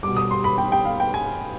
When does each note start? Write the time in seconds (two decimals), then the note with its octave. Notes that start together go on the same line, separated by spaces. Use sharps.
0.03 B2 G3 D6
0.16 D#6
0.31 C6
0.44 B5
0.58 G5
0.72 G5
0.85 F5
1.00 G5
1.14 G#5